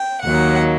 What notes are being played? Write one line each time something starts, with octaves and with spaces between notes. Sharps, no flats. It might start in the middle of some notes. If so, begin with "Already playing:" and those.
Already playing: G5
D#2 D#3 F#3 A#3 F#5